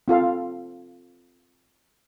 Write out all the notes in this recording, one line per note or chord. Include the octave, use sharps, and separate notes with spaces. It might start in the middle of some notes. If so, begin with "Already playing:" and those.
C4 F4 A4 F5